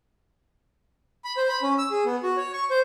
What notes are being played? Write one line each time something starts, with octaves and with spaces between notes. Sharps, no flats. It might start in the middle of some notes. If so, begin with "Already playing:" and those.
B5
C5
B5
C#4
E6
G#4
B3
F#4
C#5
C#6
C5